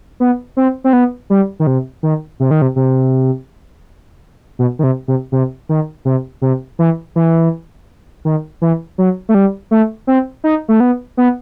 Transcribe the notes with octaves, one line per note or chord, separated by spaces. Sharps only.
B3
C4
C4
B3
G3
D#3
C3
D#3
C3
D#3
C3
C3
B2
D#3
C3
C3
C3
D#3
C3
C3
E3
E3
D#3
E3
F#3
A3
G3
A3
C4
D#4
A3
B3
B3